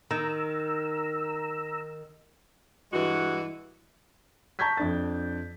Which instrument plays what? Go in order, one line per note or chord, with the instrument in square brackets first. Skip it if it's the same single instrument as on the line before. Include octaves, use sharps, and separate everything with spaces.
[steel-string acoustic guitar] D#3 [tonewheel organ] A#5 E6
[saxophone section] G2 E3 G#3 F#4
[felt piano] A5 A#5 C#6 G6 G#6 B6
F2 D4 A6